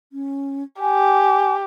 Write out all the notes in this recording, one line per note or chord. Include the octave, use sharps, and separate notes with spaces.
C#4
G4 G#5